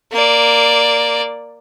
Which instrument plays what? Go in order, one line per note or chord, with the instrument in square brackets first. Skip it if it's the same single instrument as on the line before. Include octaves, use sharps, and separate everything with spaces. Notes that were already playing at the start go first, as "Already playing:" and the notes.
[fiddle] A#3 D5